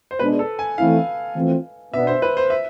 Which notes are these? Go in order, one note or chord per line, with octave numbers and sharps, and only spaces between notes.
C5
B2 G#3 D4 B4
A4
G#5
E3 A3 C4 E4 F5
E3 A3 C4 F4
B2 B3 D4 E5
C5
B4
C5
E5